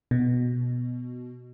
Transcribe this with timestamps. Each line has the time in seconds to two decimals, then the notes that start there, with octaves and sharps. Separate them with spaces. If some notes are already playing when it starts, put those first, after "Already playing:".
0.11 B2